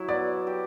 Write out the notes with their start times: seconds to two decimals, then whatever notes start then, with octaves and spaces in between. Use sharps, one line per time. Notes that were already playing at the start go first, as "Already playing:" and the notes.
Already playing: F#3 E4
0.08 B3 D5
0.47 G4